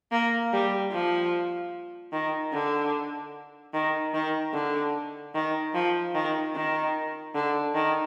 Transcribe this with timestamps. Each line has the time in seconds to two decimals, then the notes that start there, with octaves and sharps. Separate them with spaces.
0.12 A#3
0.53 G3
0.92 F3
2.13 D#3
2.53 D3
3.74 D#3
4.14 D#3
4.54 D3
5.35 D#3
5.74 F3
6.15 D#3
6.55 D#3
7.35 D3
7.75 D#3